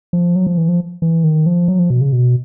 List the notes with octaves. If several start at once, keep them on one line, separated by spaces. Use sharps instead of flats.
F3
F#3
F3
E3
F3
E3
D#3
F3
F#3
F3
B2
C#3
B2